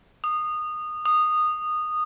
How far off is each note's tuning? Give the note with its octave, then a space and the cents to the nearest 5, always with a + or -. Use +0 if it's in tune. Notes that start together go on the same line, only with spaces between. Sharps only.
D#6 -20
D#6 -15